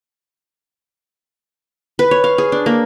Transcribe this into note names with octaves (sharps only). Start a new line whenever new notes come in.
B4
C#5
F5
G#4
D4
A#3